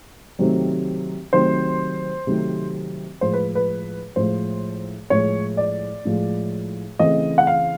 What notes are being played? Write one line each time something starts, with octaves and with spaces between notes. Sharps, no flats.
C3 D#3 F#3 A3 C4
C3 D#3 F#3 A3 C4 C5
C3 D#3 F#3 A3 C4
A2 F3 G#3 C5
B4
B4
A2 F3 G#3 C5
A2 F3 G#3 C#5
D5
A2 F3 G#3
C#3 E3 A3 C4 D#5
F#5
F5